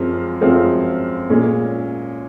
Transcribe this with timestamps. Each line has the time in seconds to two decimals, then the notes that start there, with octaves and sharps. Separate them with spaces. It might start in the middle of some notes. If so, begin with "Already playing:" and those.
Already playing: F#2 F3 G#3 C4 F4
0.41 F#2 F3 G#3 C4 F4
1.30 A#2 G#3 C#4